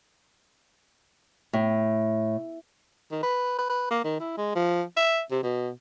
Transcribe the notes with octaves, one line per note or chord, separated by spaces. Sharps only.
A2
D#3
B4
B4
B4
A#3
D#3
E4
G#3
F3
E5
C3
B2